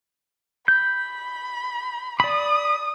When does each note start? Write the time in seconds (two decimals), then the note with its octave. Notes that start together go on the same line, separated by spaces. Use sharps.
0.68 B5 G6
2.20 D5 B5 D#6